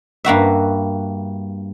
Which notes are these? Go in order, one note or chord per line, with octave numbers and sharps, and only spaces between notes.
G2 A#3 F#4 E5